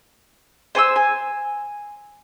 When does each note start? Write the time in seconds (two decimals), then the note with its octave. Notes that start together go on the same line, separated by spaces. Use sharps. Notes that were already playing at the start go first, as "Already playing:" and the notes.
0.75 C5 G#5 C#6 E6
0.96 G#5